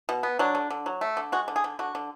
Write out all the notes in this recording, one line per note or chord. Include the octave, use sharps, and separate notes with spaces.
B2
B3
F#3 D4
D3
D3
F#3
A3
D3
G#3 F#4
D3
G#4
D3
D3 F#4
D3